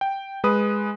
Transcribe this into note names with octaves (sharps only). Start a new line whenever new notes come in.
G5
G#3 B4 D#6